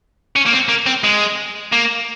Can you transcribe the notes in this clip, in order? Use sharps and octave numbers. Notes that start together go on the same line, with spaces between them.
C#4
A#3
C4
A#3
C4
G#3
A#3